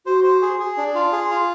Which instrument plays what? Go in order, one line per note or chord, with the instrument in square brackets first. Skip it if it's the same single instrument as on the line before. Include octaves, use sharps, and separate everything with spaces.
[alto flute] F#4 [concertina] C5
[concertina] C5
G#4
G#4
D4
F4
G#4
F4